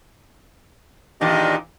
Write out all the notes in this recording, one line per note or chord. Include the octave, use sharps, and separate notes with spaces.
E2 A#2 D#3 D4 G4 D#5